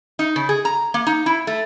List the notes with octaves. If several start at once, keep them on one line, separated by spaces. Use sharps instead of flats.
D#4
C#3
G#4
A#5
A#3
D#4
E4
A3